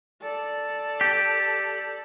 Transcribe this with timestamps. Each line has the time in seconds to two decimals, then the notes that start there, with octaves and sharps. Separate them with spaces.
0.22 A4 D5
1.01 G4